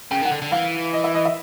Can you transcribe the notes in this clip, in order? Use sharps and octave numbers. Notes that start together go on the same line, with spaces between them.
C#3 G5
D#3 F#5
D3
D3
E3 F5
D#5
E5
D#5
E5